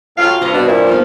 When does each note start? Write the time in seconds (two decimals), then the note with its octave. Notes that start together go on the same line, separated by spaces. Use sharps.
0.18 F#2 A2 F4 F5
0.41 G2 C3 D#5 A#5
0.54 B2 D4
0.68 A#2 E4
0.87 F3 A#3 B3 D#4